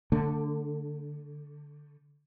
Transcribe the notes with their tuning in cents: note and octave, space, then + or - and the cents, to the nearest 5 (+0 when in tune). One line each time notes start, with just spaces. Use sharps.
D3 +0 A3 +25